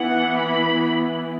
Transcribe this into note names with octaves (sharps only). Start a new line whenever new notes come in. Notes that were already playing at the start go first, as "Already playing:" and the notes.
Already playing: E3 B3 E4 F#5
B5